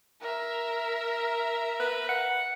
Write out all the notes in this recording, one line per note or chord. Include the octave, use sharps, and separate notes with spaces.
A#4 E5
B4
F#5